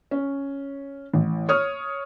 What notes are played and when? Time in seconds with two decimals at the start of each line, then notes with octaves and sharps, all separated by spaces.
0.11 C#4
1.13 A1
1.49 C#5 D#6 F6